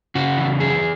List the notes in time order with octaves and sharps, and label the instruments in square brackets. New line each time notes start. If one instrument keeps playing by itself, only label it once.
[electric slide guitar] C#3 F#4
E3
F#2 G#4